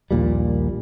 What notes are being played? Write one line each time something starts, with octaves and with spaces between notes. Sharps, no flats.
A#1 D#2 A#2 G3